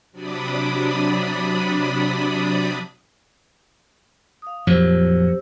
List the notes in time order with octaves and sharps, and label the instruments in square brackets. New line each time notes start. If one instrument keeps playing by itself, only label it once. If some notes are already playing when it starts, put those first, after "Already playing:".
[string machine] C3 F#3 D4 D5 B5 D#6
[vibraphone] F5 D#6
[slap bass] F2 A#2 F#3 [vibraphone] G4 C5 E6